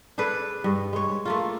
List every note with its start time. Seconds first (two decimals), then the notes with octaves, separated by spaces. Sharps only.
0.18 D4 G#4 A4 B4
0.64 G2
0.93 G#3 C#5
1.25 A3 A#3 F4